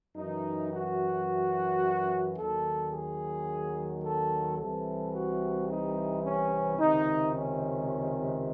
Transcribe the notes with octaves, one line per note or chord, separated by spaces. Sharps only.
F#2 E3 D#4
F#4
D#2 D#3 F#3 A4
G#4
A4
C2 C3 E3 A4
F#4
D#4
C#4
C#2 C3 D#3 D#4
C#4